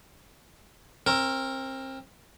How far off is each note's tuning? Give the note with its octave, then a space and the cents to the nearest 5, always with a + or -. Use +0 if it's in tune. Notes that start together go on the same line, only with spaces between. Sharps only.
C4 +30 A#4 +0